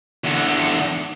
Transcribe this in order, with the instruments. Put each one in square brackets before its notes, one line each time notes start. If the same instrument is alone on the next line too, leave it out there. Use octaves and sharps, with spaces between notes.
[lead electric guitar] E2 D3